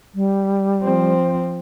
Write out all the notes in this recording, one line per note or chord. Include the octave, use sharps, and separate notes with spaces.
G3
F3 C4